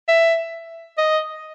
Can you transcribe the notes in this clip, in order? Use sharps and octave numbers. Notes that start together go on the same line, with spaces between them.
E5
D#5